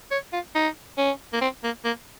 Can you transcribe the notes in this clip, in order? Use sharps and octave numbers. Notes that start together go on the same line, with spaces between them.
C#5
F4
D#4
C#4
A#3
C4
A#3
A#3